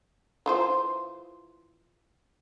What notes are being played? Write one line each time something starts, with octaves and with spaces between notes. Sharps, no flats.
E3 F4 C5